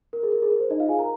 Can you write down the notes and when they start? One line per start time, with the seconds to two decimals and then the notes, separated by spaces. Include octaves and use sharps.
0.13 A#4
0.23 G#4
0.32 A#4
0.42 G#4
0.51 A#4
0.60 C5
0.70 D#4 D#5
0.79 F4 F5
0.89 G#4 G#5
0.99 A#4 A#5